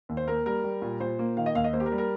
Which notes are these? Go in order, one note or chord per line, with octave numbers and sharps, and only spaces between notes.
D#2
C5
A#3 A#4
G3 A#4
G3
A#2
A#2 C5
A#3
D#3 F5
D#5
D#2 F5
D#5
A#3 C5
G4
A#4
G3
A#4